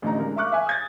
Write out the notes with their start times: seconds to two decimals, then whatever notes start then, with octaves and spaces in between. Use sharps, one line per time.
0.02 A1 D3 A3 D4 D#4 A#5
0.19 G#3 D4 A#4
0.36 E5 F5 C#6 D6 F#6
0.52 E5 G#5
0.67 D#6 G#6 A6